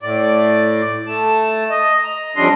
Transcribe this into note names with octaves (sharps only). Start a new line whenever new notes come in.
A2 D5
A3 A5
D#5
A#5
F2 C#3 G3 D4 D#5 C6